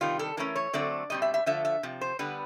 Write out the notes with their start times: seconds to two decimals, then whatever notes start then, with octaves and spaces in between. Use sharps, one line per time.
0.01 C3 D#3 G3 F4
0.19 A4
0.37 E3 A3 C#4 A#4
0.56 C#5
0.73 D3 F#3 A3 C4 D5
1.10 B2 G3 C4 D#5
1.22 E5
1.34 E5
1.46 D3 F3 A3 E5
1.65 E5
1.83 C3 F3
2.01 C5
2.19 D3 G3 B3 B4